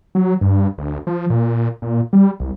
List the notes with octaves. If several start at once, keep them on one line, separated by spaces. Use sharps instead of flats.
F#3
G2
D2
F3
A#2
A#2
G3
C2